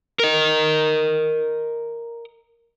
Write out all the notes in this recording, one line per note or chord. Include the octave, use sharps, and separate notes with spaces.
A#4 D#5